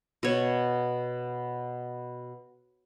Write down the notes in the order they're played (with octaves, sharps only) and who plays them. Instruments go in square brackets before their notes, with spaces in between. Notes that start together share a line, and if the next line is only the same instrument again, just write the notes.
[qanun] B2 C#5